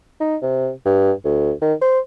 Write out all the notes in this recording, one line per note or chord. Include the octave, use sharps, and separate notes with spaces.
D#4
C3
G2
D2
D#3
C5